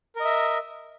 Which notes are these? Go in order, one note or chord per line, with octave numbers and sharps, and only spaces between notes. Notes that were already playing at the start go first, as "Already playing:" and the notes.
A#4 D#5 E5